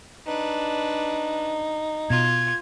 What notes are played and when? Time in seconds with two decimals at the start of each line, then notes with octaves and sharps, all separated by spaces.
0.27 D4 D#4 B4
2.10 B2 F4 G#6